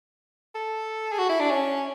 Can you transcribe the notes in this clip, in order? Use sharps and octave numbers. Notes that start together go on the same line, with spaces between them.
A4
G#4
F#4
E4
D4
C#4